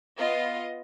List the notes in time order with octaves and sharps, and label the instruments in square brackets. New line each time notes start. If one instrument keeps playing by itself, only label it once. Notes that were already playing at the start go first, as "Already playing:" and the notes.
[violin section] B3 F4 D#5